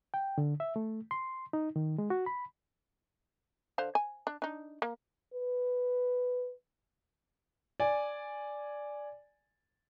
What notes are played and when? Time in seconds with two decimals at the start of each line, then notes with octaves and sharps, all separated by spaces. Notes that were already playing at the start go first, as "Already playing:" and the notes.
0.14 G5
0.38 D3
0.60 E5
0.76 A3
1.11 C6
1.53 D#4
1.76 D#3
1.98 G#3
2.10 F#4
2.26 B5
3.78 D3 C5 F5
3.95 G#5
4.27 D4
4.42 D4 D#4
4.82 A#3
5.34 B4
7.80 D5 G#5